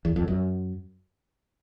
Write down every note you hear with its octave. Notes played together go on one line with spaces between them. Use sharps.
E2
F2
F#2